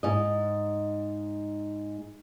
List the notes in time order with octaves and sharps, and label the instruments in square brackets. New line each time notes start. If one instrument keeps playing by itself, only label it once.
[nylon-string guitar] G#2 D#5